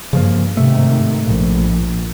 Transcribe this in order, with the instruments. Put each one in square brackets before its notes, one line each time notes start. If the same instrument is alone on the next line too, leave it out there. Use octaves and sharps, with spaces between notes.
[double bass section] G2 [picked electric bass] C#3 F3 A#3
[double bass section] G#2 C3 D#3 [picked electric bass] A3
[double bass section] A#1